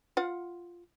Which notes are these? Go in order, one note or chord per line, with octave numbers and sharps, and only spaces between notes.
F4 F5 F#5